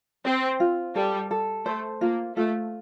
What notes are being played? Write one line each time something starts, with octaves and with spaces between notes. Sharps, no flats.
C4 C5
F4
G3 A4
A4
A3 C5
A#3 F4
A3 F4